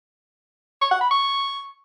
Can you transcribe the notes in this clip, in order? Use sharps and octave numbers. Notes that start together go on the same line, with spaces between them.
C#6
F#5
B5
C#6